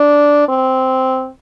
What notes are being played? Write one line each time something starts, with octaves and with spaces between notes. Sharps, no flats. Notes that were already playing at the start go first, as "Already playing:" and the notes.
Already playing: D4
C4